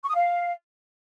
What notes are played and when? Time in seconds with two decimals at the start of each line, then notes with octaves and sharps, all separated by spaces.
0.03 C#6
0.09 D#6
0.15 F5